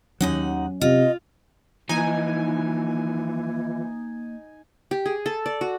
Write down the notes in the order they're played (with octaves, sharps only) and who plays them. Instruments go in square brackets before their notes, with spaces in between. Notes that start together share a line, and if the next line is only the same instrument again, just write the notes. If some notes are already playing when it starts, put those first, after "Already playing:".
[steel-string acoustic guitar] D#2 D#4 F#5 [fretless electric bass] F#3 C#4
[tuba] C3 [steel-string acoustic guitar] F4 [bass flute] D#5
[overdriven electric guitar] E3 F3 [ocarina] A#3 [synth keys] D#4 G#5
[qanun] G4
G#4
A4
D5
F#4